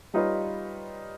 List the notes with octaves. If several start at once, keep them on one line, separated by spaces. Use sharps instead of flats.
G3 D#4 F4 B4 C#5